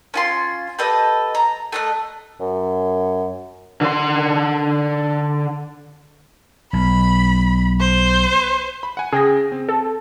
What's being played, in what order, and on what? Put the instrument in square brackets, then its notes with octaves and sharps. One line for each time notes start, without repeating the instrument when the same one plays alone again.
[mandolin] C#4 F4 C6
G4 A4 B4 D#5
A#5
A3 D#5 F#6
[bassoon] F#2
[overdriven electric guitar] D3 C6
[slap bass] B1 [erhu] B5
[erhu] C5
[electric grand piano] B5
F#5 G#5
[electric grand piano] C#3 G5 A#6 [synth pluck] G#4
[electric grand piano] C4
[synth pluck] A4